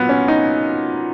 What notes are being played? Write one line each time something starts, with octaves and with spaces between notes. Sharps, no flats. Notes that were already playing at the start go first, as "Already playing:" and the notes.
Already playing: A#2 F#3 B3
C#4
D#4